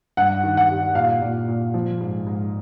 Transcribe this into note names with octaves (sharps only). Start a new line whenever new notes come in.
G2 F#5
D#3
F#5
G3
A#2 F5
A#2
A#2
F3
G#2
G#2